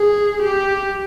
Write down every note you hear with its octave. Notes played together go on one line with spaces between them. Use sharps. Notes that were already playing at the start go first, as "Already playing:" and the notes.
Already playing: G#4
G4